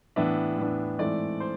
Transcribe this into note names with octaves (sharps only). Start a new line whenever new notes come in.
A2 E3 B3 D4 E5
A2 E3 B3 D4
G#2 E3 A3 C4 D5
C5